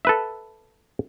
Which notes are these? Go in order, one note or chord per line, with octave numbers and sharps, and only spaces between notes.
A4 B4 E5